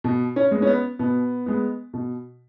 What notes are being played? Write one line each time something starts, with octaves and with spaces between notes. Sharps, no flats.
B2
C#4
G#3 B3
C#4
B3
B2 B3
G#3 B3
B2